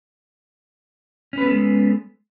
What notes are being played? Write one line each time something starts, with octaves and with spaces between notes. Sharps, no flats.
G#3 B3 C#4 A4 B4